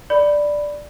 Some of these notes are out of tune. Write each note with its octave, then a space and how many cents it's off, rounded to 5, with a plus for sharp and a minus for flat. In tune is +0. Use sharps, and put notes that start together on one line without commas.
D5 +0 B5 +0